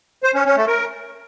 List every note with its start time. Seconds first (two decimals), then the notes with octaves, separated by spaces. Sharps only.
0.23 C5
0.34 C#4
0.45 C#4
0.56 A3
0.67 A#4